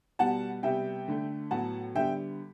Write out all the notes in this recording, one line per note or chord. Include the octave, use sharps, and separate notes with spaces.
B2 G3 B3 F#5 A5
C3 G3 B3 E5 G5
D3 A3
A2 F#3 B3 F#5 A5
D3 G3 B3 E5 G5